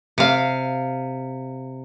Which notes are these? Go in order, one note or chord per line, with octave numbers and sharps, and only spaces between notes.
C3 F5